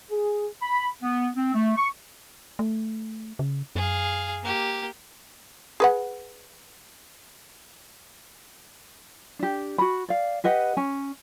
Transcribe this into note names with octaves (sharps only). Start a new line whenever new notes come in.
G#4
B5
B3
C4
A3
C#6
A3
C#3
F#2 G#4 F5
A#3 G4
G#4 B4 F#5
D4 G4
F#4 B5
D5 F5
G4 B4 D#5 F#5
C#4 G#5